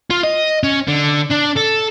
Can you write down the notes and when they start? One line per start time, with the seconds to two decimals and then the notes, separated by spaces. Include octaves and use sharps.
0.10 F4
0.23 D#5
0.63 C#4
0.87 D3
1.30 D4
1.56 A4